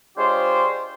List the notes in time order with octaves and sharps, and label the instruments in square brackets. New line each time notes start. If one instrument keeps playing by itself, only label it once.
[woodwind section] G#3 D4 F4 G4 C5 C#5